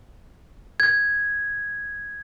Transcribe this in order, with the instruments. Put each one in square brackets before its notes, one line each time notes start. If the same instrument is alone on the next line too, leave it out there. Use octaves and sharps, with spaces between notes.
[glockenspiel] G#6